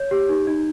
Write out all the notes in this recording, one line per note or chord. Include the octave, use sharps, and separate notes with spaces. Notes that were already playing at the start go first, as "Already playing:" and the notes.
Already playing: C#5 G6
G4
D#4
D#4